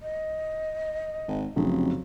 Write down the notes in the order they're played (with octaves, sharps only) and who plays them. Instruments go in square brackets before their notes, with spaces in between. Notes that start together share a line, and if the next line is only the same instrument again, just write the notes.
[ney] D#5
[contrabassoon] G#1
[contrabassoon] F1 [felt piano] F2 C#3 F#3